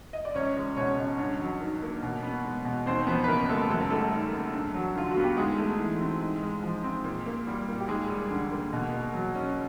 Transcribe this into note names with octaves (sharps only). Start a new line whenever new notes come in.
D#5
D5
C#2 C#4 C#5
G#3
B2 C#4 C#5
C#2
G2
F#3
D#3
A#3
B2
B3
G#3
B2
D#2 C4 C5
C5
F3 B3 B4
B4
C#3 A#3 A#4
G#3 A3 A4
F#2 A4
A#4
G3 A3 A4
D#3
A#3
G2
F#3
D3 F4
F#4
B3
G4
G#2 G#3 G#4
A3
E3
C4
G#2
G#3
F3
C4
A#2
A#3
G3
A#2
G4
D#2 G#3 G#4
G3
D3
A#3
B2
A#3
F#3
C#4